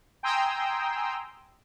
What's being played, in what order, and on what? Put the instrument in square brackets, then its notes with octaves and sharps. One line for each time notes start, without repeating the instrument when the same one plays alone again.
[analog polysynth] G5 G#5 A#5 C6 D#6 E6